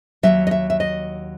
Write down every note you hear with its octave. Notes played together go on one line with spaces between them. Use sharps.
D#2 D#3 F#3 E5
D#5
E5
E5
D#5